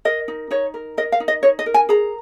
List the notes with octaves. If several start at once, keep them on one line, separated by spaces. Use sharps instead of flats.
A#4 D#5
D#4
D#4 C#5
A#4
A#4 D#5
F5
D#4
D#5
D#4 C#5
D#5
A#4
G#5
G#4 A#5